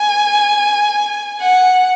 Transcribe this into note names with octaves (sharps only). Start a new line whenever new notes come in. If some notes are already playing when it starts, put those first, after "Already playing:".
Already playing: G#5
F#5